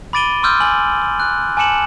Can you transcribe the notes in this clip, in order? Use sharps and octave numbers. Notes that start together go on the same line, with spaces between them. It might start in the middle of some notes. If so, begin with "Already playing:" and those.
B5 D6 A6 D7 D#7 G7
C6 D6 E6 F6 G6
G#5 F#7
F#6
G#5 A5 D6 C#7 E7 F#7